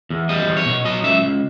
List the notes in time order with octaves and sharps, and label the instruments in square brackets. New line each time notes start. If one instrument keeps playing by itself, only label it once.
[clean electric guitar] E2
G3 D#5
E2
C#5
B2
F#3 D#5
C#2 E5
C#2